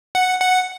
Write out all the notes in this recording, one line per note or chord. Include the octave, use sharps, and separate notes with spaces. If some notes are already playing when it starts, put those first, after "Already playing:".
F#5
F#5